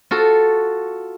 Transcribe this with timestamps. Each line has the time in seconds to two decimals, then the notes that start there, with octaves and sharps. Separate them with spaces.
0.11 F4 F#4 A4